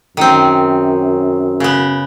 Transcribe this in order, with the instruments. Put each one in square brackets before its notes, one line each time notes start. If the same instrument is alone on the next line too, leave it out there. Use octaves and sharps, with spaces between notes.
[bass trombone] F#2 [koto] D#3 C4
[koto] C#3 B3